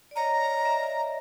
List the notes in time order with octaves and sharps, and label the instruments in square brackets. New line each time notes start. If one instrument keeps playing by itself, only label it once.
[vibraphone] D5
[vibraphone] C#5 D#5 [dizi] A#5
[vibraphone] D#5
D5 E5